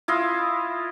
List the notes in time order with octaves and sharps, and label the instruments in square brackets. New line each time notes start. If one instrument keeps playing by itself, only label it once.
[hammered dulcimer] E4 F4 D#5 F5